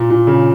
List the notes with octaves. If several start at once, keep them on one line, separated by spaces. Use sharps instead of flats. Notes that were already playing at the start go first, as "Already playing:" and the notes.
Already playing: A#2
A#2
C#3